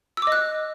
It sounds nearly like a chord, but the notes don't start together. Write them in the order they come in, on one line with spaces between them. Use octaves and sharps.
E6 D6 D#5 F#6